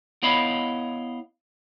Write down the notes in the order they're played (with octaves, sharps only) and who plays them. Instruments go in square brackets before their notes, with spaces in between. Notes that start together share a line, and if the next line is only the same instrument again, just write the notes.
[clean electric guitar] B3 E4 C#5 D#5 F5 B5